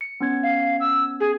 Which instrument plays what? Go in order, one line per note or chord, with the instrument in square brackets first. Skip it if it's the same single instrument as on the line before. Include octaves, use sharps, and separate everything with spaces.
[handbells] C#7
B3 C#4 G#6
[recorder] F5
E6
G#4